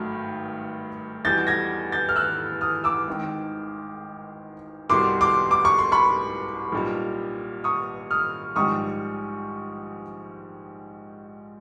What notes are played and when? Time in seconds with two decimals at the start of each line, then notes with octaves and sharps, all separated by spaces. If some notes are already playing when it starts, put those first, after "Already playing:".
Already playing: G#1 G2 D#3 F#3 A3
1.25 E2 B2 G3 G6 A6
1.47 G#6 A#6
1.92 G6 A6
2.09 F6
2.16 E6 F#6
2.61 D#6 F6
2.84 D6 E6
3.07 G#1 G#2 D#3
4.90 C2 B2 G3 C6 D6
5.21 C6 D6
5.51 D6
5.65 C#6
5.79 C6
5.92 B5 C#6
6.72 B1 A#2 G3
7.64 C#6 D#6
8.11 D#6 F6
8.56 A#1 G#2 D#3 G3 C#6 D#6